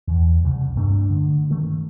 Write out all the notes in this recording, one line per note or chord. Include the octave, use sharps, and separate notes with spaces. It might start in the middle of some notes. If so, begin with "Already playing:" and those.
E2
C2 C#3 G3
G2 A3 D4
D3
G2 D#3 A3